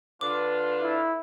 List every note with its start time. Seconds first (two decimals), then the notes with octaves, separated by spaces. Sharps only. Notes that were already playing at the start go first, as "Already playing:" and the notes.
0.21 D3 D4 F4 B4 D6
0.82 E4